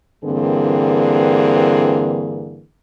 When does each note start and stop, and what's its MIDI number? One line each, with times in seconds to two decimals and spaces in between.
0.24 2.63 43
0.24 2.63 50
0.24 2.63 52
0.24 2.63 58
0.24 2.63 60
0.24 2.63 68